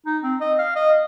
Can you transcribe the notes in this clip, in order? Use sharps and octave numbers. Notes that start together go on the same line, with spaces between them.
D#4
C4
D#5
F5
D#5